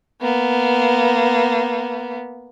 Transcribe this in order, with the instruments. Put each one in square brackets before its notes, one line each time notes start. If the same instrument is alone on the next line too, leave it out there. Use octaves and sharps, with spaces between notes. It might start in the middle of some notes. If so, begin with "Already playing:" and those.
[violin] A#3 B3